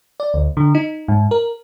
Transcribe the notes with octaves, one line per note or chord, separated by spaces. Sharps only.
D5
D2
D3
D#4
G#2
A#4